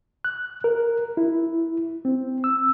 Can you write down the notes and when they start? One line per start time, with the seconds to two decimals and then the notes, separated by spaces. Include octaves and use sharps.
0.25 F#6
0.64 A#4
1.17 E4
2.05 C4
2.44 E6